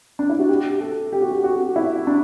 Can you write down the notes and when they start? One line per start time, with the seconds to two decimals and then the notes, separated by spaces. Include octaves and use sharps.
0.19 D4
0.29 E4
0.39 F#4
0.49 G4
0.70 G4
0.81 A4
1.12 G4
1.22 F#4
1.31 G4
1.44 F#4
1.76 E4
2.07 D4